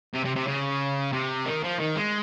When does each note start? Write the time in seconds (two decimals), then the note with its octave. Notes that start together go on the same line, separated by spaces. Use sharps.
0.14 C3
0.25 C3
0.36 C3
0.48 C#3
1.13 C3
1.46 D#3
1.64 F3
1.80 D#3
1.97 G#3